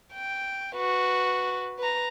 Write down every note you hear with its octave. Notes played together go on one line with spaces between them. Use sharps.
G5
F#4 B4
B4 A#5